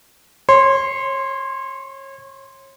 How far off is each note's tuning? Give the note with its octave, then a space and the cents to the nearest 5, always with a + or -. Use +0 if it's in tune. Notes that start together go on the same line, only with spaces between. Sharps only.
C#5 -30 C6 +0